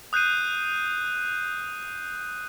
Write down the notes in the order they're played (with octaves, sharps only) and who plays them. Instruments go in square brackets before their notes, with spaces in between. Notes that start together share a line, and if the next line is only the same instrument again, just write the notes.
[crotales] D#6 F#6 G6 C7 D#7